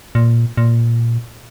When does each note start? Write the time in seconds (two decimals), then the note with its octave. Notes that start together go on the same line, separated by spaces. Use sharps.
0.15 A#2
0.57 A#2